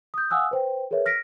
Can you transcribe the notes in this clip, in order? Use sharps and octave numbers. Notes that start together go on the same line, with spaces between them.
D#6 G6
F5 F#5 G#5 D#6 E6 F#6
B4 C5 G5
G#4 A#4 B4 C#5 E5
F6 A#6 B6 D7